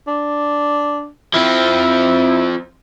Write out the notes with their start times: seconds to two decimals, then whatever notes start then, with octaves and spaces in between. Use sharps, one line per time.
0.07 D4
1.34 F3 C4 E4